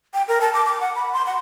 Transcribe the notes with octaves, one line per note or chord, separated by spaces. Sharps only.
G5
A#4
A5
D6
D6
F#5
B5
C6
F#5